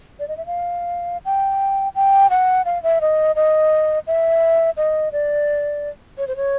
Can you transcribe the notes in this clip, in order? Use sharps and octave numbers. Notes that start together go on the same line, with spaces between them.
D5
D#5
E5
F5
G5
G5
F#5
F5
E5
D#5
D#5
E5
D#5
D5
C#5
C5
C#5